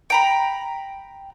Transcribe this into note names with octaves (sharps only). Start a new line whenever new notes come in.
G5 A#5 B5